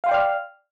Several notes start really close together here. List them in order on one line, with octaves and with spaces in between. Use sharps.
F5 C6 G5 D5 F6